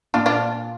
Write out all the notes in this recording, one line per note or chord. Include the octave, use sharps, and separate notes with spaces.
A#2 D4 F4
D4 F4